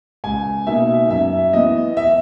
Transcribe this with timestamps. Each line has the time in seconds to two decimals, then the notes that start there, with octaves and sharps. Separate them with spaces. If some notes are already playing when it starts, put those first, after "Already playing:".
0.24 C#2 G#5
0.67 B2 A#3 D#4 E5
1.10 F#2 E5
1.53 E3 B3 D#5
1.97 E5